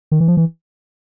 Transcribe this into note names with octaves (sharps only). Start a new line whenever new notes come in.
D#3
E3
F3
E3